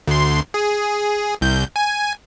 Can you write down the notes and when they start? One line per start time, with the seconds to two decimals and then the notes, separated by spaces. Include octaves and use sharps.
0.08 D2 C6
0.54 G#4
1.41 C2 G6
1.76 G#5